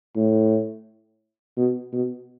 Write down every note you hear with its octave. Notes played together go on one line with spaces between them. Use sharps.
A2
B2
B2